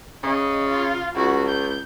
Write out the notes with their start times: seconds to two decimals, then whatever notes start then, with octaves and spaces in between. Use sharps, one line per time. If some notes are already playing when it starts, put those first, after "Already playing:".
0.23 C#3 D#5
0.68 F4
1.16 C#2 F#4
1.50 G6